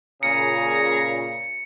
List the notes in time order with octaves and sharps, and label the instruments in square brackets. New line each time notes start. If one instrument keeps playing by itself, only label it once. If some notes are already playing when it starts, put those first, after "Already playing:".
[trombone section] A#2 C#3 [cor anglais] G#4 [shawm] A#5 [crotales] C#7